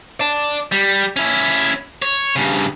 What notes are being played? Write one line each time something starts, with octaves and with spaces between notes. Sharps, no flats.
D5 A5
G3
C#4 E4
C#5
G2 C#3